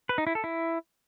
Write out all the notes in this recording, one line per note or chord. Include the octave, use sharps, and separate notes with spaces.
B4
D#4
E4
A4
E4